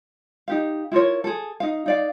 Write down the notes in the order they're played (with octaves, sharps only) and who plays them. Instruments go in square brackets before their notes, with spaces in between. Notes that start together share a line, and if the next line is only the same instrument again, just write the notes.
[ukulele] D#4 G4 F5
E4 F4 A#4 C#5
G#4 A4
D#4 F5
D#4 D5 F5